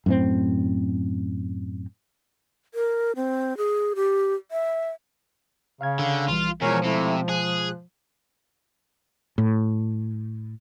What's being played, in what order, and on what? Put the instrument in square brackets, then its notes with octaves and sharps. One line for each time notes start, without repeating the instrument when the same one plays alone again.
[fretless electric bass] F#2 A2 C4
[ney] A#4
C4
G#4
G4
E5
[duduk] C#3 [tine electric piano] F5 F6 G#6
[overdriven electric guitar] D3
[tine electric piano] A#1 E3 G3 [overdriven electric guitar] F4
[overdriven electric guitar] E2 [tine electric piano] B2 G#3 F4 [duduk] F3 [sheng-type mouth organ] A#4 C#5 G#5
[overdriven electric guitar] C3 [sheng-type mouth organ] A3 E4
[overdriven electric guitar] G#4 [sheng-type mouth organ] F#6
[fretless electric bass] A2